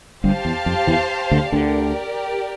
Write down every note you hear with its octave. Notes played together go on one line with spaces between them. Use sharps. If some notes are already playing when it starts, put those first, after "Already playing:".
G1 G2 G4 C5 F5 A5
E2
F2
E2 E3
D2 D3
D2 D3 G4 A#4 D5